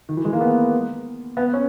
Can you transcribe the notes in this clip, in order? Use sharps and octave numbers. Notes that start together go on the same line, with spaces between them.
D#3
E3
G#3
A#3
B3
B3
C#4